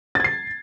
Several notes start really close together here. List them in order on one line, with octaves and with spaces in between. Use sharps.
A6 G#6 C7